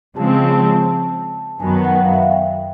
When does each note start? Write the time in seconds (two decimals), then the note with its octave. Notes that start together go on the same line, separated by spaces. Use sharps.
0.16 C#3 F3 G#3 C4 A5
0.53 A5
1.60 F#2 D#3 F#3 B3 G#5
1.85 F#5
1.95 G5
2.05 F5
2.14 E5
2.23 F5
2.32 G5